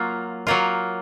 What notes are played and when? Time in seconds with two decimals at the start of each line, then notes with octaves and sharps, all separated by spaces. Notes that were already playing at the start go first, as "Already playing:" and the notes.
Already playing: F#3 A#3 F4
0.47 F#3 A#3 F4